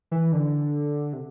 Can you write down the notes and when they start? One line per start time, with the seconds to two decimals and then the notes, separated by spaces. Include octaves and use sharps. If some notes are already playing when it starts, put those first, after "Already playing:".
0.11 E3
0.32 D3
1.13 C3